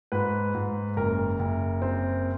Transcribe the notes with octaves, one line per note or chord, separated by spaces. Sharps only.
G#2 B4
G#2
F#1 A#4
F#1
C4